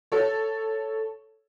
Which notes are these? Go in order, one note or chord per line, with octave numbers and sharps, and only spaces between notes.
A4 C#5